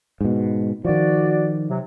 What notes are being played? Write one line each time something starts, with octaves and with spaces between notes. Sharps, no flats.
G#2 B2
D#3 F3 F#4 D5
C3 F#3